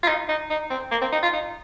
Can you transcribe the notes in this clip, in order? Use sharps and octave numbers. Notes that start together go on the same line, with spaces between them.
F4
D#4
D#4
D#4
C4
A#3
C4
D#4
F4
D#4